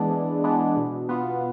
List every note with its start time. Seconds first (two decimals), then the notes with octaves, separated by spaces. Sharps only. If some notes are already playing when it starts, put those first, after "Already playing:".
Already playing: E3 G#3 B3 D4
0.11 E3
0.44 G#3 B3 D4
0.76 B2
1.09 B3 F4